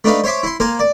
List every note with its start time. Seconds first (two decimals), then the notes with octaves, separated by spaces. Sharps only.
0.04 A3 D4 D#4 B4 F5
0.24 C5 C#5 E5 C6 D6
0.43 E4 C6
0.60 A#3 A#4 C5 G#5
0.79 D5